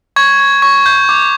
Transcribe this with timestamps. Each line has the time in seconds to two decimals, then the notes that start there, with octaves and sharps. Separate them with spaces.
0.16 C#6 G#6
0.40 C#6
0.62 C#6
0.86 G6
1.09 D6